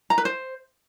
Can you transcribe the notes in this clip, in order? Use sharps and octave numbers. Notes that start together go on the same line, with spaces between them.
A#5
B4
C5